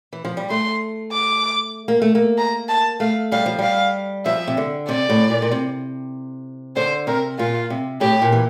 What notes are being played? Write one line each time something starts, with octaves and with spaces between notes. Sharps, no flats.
E3
F3
G3
A3 C6
D6
A#3
A3
A#3
A#5
A5
A3 F5
G3 F5
F3
G3 F5
F3 E5
C3
D3
C3 D5
A2
A#2
A#2
C3
D3 C5
C3 A#4
A#2 F4
C3
A2 G4
A#2
E3